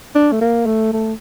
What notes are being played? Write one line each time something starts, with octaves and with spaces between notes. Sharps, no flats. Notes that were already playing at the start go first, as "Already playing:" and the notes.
D4
A3
A#3
A3
A3